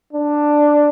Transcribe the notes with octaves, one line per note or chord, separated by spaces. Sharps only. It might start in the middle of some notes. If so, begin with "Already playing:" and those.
D4